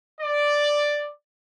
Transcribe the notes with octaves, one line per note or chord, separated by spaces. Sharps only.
D5